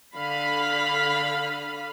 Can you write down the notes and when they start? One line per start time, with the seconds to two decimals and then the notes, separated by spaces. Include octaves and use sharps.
0.14 D3 F5 B5